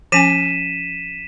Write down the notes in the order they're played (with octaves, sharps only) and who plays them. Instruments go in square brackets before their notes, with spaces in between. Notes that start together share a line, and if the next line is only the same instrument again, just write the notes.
[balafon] F3 C#4 G#5 [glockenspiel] B6 D#7 E7